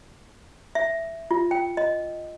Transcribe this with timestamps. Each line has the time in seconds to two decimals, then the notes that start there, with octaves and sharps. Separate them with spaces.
0.75 E5
1.31 F4
1.51 G5
1.77 D#5